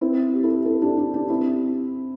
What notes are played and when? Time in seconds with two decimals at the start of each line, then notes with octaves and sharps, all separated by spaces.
0.01 C4 E4
0.33 G4
0.44 E4 A4
0.66 E4 A4
0.82 D4 G4
0.97 D4 G4
1.14 D4 G4
1.30 C4 E4